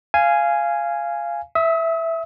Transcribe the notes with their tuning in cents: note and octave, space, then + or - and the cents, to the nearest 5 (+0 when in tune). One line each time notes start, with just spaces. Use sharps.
F5 -15 G#5 +0
E5 +0 D#6 +45